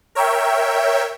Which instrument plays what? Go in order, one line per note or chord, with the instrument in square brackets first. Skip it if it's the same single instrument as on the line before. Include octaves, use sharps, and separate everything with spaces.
[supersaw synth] A#4 C#5 E5 G5